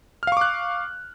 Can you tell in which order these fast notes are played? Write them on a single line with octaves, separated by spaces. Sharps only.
F6 F5 C#6 D6 F#6